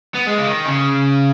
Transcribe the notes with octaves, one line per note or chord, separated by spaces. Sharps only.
B3
G#3
C#3
D#3
C#3